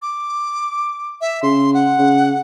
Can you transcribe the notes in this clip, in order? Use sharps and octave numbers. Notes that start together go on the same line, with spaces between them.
D6
E5
C#3 C6
F#5
C#3